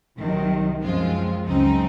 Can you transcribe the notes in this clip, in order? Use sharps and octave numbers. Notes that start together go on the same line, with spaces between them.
C2 C3 D#3 F#3
F#2 F3 G#3 C4 F4
C#2 C#3 F#3 C4 D#4